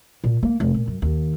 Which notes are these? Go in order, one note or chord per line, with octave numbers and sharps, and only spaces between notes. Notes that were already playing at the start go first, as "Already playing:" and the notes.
A#2
A#3
F1
A#2
F#2
D#2